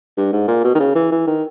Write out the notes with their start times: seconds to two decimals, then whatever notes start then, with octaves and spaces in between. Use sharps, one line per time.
0.17 G2
0.33 G#2
0.48 A#2
0.64 B2
0.75 D#3
0.80 C#3
0.95 E3
1.12 E3
1.27 D#3